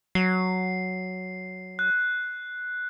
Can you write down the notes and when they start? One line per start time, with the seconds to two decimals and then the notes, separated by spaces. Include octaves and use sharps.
0.15 F#3 C7
1.79 F#6